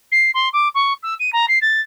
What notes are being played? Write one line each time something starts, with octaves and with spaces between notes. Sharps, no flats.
C7
C6
D6
C#6
E6
D#7
A#5
C7
A6